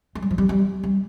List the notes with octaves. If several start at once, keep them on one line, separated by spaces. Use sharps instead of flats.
A3
G3
F3
G3
G3
G3